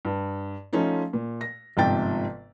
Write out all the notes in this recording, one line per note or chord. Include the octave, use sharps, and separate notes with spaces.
G2
F3 A3 C#4 D#4 F4
A#2
A#6
G1 G#2 C3 F3 G5 A6